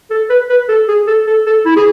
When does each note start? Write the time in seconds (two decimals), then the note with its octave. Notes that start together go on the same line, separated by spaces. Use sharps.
0.11 A4
0.30 B4
0.50 B4
0.69 A4
0.88 G#4
1.07 A4
1.27 A4
1.47 A4
1.66 E4
1.76 G#4